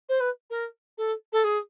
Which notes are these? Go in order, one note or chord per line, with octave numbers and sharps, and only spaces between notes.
C5
B4
A#4
A4
A4
G#4